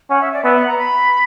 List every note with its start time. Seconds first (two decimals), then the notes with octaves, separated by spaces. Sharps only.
0.10 C#4 F#5
0.21 E5
0.33 D5
0.44 B3 E5
0.56 F#5
0.67 A#5
0.78 B5